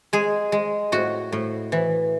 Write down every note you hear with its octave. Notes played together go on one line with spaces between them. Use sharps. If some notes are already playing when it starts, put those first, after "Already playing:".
G#3 G#4
G#3
A2 F#4
A2
E3